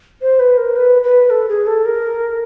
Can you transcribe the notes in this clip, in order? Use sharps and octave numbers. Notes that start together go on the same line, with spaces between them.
C5
B4
A#4
B4
B4
A4
G#4
A4
A#4